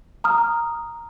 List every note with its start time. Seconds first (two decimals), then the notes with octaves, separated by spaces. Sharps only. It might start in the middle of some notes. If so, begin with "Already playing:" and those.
0.24 A#5 D#6 F6